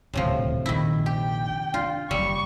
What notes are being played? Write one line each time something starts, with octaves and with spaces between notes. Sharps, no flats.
D#1 D2 A2 C3 F3
A#1 F2 D#3 E4
G4 G5
D4 F4
F#1 G3 C#6